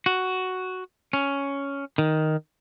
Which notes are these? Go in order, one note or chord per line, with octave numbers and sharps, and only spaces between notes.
F#4
C#4
D#3